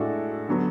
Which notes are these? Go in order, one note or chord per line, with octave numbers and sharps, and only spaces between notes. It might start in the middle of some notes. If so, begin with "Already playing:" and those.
Already playing: A2 G#3 D4 F#4 A4
D3 F#3 B3